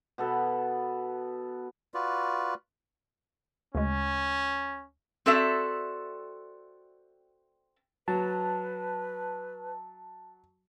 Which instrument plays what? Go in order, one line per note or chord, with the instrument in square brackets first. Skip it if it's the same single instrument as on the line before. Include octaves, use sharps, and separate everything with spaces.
[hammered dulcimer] B2 B3 A4
[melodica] F4 F#4 B4 D5
[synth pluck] D2 C#3 G#3 [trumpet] C#4
[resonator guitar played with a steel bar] C4 F#4 A4 D5 E5
[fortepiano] F#3 [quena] B4 [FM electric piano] A5